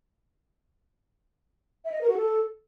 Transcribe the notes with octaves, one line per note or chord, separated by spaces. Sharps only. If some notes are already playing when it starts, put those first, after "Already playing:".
E5
D#5
A#4
F#4
A4